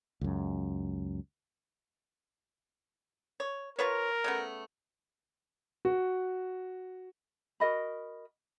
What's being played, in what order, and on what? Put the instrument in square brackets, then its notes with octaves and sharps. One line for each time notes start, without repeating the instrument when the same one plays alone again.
[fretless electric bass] C#2 F#2
[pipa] C#5
[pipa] F4 B4 C#5 [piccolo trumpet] A#4
[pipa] C#3 A3 B3
[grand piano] F#4
[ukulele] F#4 A#4 D#5 B5